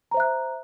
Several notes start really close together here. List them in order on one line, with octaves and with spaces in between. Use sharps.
A#5 C5 E5 F#6